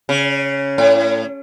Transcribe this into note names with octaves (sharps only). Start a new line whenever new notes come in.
C#3
A2